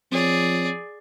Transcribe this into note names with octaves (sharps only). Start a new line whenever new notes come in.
F3 C4 G#4 C#5 D5